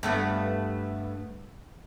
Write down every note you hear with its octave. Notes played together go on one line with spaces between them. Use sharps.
G2 A3 B3